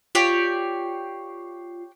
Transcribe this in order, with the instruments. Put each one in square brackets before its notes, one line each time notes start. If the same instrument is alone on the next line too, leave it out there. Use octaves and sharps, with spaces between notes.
[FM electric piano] F4 [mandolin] G4 C#5 D5